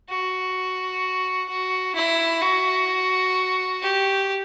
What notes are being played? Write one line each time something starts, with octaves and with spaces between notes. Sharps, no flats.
F#4
F#4
E4
F#4
G4